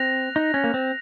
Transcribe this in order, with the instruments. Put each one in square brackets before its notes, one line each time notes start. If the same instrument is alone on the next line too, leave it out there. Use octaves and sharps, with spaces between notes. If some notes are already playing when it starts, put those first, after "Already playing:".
Already playing: [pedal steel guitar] C4 [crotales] F#6 A#6 F7
[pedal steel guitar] D#4
C#4
A#3
C4